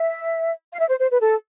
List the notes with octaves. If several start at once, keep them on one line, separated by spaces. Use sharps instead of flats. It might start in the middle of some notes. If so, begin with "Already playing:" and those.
Already playing: E5
F5
E5
C5
C5
B4
A4